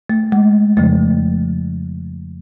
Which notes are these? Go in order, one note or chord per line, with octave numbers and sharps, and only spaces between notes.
A3
G#3
F2 C#3 F3 A3